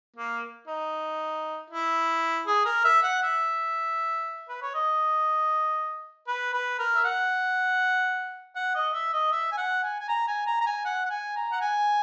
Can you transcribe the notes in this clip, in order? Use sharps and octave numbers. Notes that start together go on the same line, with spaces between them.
A#3
D#4
E4
G#4
A#4
E5
F#5
E5
B4
C#5
D#5
B4
B4
A#4
E5
F#5
F#5
D#5
E5
D#5
E5
G#5
F#5
G#5
G#5
A#5
G#5
A#5
A#5
G#5
F#5
F#5
G#5
A#5
F#5
G#5